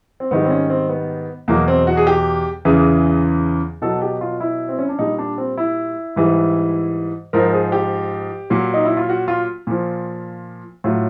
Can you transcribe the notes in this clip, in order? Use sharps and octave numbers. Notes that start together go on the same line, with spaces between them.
C4
G#2 D#3 G3 B3
C4
C#4
C4
B3
E2 B2 F#3 A#3
C4
F#4
G#4
G4
E2 C#3 E3 G#4
B2 F#3 A4
G4
F4
E4
C4
C#4
D4
A#2 G3 D#4
D4
C4
E4
G#2 E3 G3
G#2 F3 A#4
G#4
G4
A#2 F#3
D#4
E4
F4
F#4
F4
A#2 F3
A2 F#3 F4